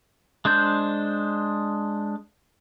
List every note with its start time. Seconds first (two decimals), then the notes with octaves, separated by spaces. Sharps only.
0.45 G#3 D4 C5 G6